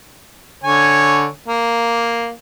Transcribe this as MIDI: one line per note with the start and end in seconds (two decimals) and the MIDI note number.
0.64 1.27 50
0.64 1.27 73
0.64 1.27 80
1.48 2.30 58